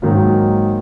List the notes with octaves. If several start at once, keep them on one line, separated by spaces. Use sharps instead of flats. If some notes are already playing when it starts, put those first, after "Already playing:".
G#2 D#3 F#3 A#3